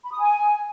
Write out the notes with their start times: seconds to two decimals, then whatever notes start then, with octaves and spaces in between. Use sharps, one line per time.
0.04 B5
0.12 D#6
0.19 G#5